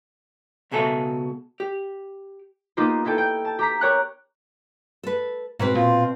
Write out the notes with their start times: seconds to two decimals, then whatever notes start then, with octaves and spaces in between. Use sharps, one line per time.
0.71 C#2 B2 G#4 A4 E5
1.60 G4
2.77 A#3 B3 D#4 F4 G4
3.05 D#4 E4 A4 G5
3.18 G5
3.45 A5
3.59 G4 A#5 B6
3.81 G4 A#4 C#5 G5 A#5 F#6
5.03 A4 B4
5.59 G#2 B2 C4 B4
5.75 A#2 F4